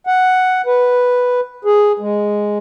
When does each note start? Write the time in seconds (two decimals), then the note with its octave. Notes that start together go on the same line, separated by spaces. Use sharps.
0.07 F#5
0.66 B4
1.65 G#4
1.99 G#3